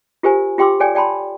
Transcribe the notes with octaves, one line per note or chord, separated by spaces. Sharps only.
F4 G4 A#4 C5 G#5
F4 G4 G5 C6 D6 E6
A4 C#5 D5 G5 G#5
D5 G5 A5 B5 C6